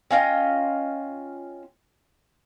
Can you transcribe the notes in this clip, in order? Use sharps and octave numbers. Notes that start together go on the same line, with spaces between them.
C#4 F4 D#5 G5